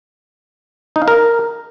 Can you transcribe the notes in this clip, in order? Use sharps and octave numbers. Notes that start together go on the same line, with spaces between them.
D#4
F5
A#4